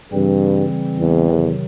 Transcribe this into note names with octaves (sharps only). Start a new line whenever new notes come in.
G2 C#3 E3 G3 C4
E2
C3 D#3 F#3